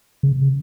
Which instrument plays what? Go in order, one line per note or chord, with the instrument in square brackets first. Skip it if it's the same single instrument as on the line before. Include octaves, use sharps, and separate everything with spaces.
[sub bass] C#3